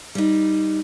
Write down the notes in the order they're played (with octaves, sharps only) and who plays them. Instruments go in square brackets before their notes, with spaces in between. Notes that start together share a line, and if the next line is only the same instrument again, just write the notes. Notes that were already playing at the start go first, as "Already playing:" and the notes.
[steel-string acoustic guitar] G3 D#4